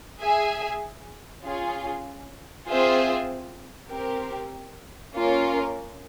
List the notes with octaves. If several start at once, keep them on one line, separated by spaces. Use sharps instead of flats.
G#4 E5 G#5
C#4 F4 G#4
C4 F4 G#4 C5 E5
C4 G4 A#4
A#3 C#4 F4 A#4